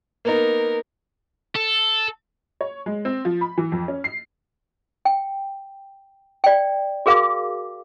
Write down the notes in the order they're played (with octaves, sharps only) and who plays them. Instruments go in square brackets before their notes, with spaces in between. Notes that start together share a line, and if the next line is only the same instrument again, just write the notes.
[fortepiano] A#3 B3 D#4 [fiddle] A#4
[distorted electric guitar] A4
[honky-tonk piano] C#5
G#3
C4
F3
B5
E3
F2
C#4
C7
[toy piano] G5
D5 G5
F#4 G#4 A#4 F5 D6